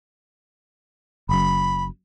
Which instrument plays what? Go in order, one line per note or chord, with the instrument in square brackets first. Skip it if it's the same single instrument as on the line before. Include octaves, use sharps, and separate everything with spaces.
[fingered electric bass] F#1 F#2 [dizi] B5